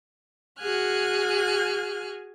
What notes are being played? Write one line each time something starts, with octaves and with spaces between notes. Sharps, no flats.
F#4 G#4 G#5 F6 F#6